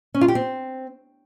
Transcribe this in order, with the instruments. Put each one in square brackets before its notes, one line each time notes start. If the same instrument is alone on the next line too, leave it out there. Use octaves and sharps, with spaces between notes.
[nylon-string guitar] C#4
F4
G4
C4